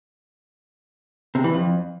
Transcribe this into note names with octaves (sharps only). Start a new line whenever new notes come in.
C3
E3
F2